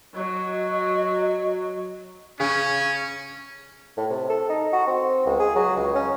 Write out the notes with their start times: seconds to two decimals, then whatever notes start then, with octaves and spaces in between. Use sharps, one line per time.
0.15 F#3 D#5
2.40 C#3 C#4
3.97 A2
4.10 C3
4.30 A4
4.49 D#4
4.73 F#4
4.87 C4
5.26 C#2
5.40 G#4
5.56 F#3
5.76 C#2
5.95 C#4